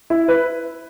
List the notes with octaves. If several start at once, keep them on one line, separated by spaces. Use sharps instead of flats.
E4
B4